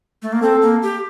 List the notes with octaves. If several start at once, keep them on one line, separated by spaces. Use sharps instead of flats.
A3
A#3
C4 A4
A#3
G4